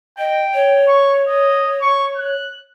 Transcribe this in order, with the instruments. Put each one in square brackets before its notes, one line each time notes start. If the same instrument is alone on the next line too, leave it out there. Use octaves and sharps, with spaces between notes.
[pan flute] D#5 [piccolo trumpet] G5
[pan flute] C#5
[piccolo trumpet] C#6
D#5
C#6
F#6